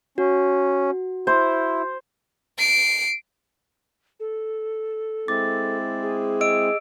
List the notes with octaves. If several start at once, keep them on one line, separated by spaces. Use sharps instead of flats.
C#4 F#4
E4 C5
C7 D7
A4
G#3 C4 E4 D6 A6
G#4
D#5 E6 D7